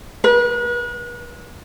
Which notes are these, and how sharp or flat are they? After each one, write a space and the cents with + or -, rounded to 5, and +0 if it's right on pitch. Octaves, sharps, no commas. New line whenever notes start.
B4 -40